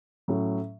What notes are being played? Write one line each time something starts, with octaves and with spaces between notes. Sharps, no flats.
A2 F#3 C#4